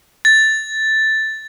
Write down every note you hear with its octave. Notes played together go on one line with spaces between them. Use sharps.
A6